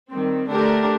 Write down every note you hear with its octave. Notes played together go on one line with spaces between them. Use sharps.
D#3 G3 C4
D3 A3 D4 G4 A#4